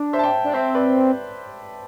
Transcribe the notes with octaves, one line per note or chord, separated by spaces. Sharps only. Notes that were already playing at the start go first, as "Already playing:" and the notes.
Already playing: D4
C5 E5
A5
E5 G5
D4
C4 C5 E5
B4 D5